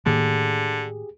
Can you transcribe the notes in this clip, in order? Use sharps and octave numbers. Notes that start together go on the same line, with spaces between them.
A2 D3 D#3 A#3 G4 G#4